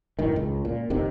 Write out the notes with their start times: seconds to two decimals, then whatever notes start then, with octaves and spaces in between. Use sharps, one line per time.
0.19 F#2 A2 D#3
0.36 C#2
0.65 A#2
0.90 F1 C3 D#3